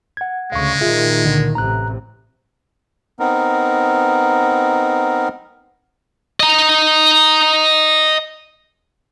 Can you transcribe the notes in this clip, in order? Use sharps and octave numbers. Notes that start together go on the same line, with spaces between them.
F#5 G#6
D2 C#3 G#3 F5 C#6
A#2 D#3 F4 G#4 E5
C#2 D3
A1 C3 A#5 F#6
B3 C4 D#4 A#4
D#5 A#5